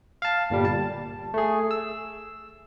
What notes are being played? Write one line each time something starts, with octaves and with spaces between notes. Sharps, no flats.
F5 A5
G1 A#2 G3
A5
A3 G#4
E6